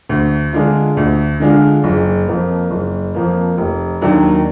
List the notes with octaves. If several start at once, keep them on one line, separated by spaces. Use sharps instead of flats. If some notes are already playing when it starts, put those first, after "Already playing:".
D2
D3 G#3 D4 F4
D2
D3 G#3 D4 F4
F#1
F2 F3 A#3
F#1
F2 F3 A#3
F1
D#2 D#3 F#3 D4